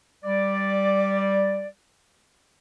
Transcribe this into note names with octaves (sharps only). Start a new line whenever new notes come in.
G3 D5